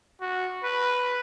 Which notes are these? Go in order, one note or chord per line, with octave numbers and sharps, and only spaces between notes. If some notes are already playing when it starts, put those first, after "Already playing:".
F#4
B4